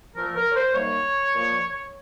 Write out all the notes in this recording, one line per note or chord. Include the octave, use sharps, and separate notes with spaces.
A#2 F3 A3 A#4
A#4
C#5
C5
F#2 D#3 G3 A#3 C#5
A#2 F3 A#3